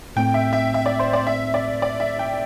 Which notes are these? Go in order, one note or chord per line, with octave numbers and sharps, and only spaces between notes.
A2 A3 C4 G5
E5
E5
E5
D5
C5
D5
E5
D5
D5
E5
G5